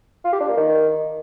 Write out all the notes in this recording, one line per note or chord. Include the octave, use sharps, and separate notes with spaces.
F4
G4
D4
A#3
D#3